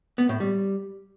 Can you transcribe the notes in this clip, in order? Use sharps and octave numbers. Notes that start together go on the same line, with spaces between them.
B3
A2
G3